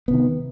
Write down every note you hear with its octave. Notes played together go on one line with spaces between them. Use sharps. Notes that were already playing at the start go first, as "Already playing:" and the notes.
C3 D#3 B3